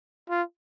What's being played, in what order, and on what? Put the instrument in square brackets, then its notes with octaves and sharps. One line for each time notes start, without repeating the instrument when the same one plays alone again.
[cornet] F4